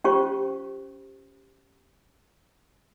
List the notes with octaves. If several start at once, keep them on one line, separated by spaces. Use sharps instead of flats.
C#4 F4 G4 C5 C#6